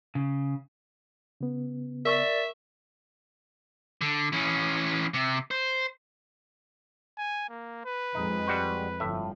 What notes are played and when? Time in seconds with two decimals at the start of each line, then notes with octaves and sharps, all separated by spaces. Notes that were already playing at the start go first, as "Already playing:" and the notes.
0.15 C#3
1.41 C#3 B3
2.05 A#4 D5 E5 C#6 E6
4.01 D3
4.33 E3 C#4
5.14 C3
5.51 C5
7.18 G#5
7.49 A#3
7.85 B4
8.15 F2 G#3 D#4
8.47 G3 F#4 C5
9.00 G1 A2 F3 E5